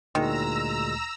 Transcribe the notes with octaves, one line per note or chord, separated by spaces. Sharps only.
D2 A#2 D#3 G#3 A#5 E6